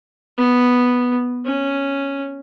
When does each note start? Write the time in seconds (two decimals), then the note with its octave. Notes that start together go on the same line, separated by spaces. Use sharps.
0.37 B3
1.45 C#4